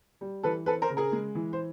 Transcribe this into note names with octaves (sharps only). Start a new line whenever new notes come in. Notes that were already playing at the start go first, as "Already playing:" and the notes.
G3
E3 A4 B4
C4 A4 B4
A#4 C5
C#3
G#4 A#4
G#3
E3
C5